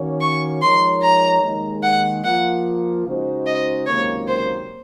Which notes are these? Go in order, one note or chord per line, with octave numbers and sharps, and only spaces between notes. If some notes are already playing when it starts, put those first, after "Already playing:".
Already playing: D#3 A#3 C#4 F#4 C#5
C#6
F3 G#3 D#4 A#4 C#5 C6
A#5
D#2 D#3 G#3
F#5
F3 A#3 F4 F#5
C#3 G#3 D#4 F#4 C5
D#5
C#2 C3 D#3 F#3 A#3 C#5
C5